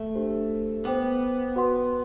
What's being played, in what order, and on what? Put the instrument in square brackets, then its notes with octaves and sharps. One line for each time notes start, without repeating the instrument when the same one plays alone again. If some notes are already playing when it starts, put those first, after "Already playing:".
Already playing: [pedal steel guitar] A3
[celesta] D4 G4 C5
[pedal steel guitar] B3 [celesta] C5 G5 D6
[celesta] F#4 B4 F#5 C6